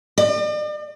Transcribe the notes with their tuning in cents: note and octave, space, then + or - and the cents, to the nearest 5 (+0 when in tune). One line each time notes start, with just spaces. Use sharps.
D5 +45